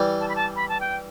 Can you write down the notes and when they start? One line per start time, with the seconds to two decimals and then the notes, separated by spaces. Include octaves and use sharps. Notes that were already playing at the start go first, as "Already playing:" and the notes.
Already playing: E3 G3
0.20 A5
0.29 B5
0.36 A5
0.56 B5
0.69 A5
0.80 G5